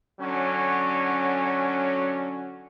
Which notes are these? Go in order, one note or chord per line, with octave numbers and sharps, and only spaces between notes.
D3 F#3 C#4